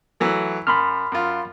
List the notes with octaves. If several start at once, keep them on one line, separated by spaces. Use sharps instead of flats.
E3 F#3 A3
F#2 B5 C6 F6
F#2 F4